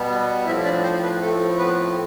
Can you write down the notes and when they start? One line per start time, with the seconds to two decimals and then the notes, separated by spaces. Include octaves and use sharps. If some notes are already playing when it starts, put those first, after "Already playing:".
Already playing: B2 G3 B3
0.45 A2 F3 C4 E4 E5
0.64 D4 D5
0.83 C4 C5
1.02 B3 B4
1.20 A2 F3 A3 C4 A4
1.58 B3 B4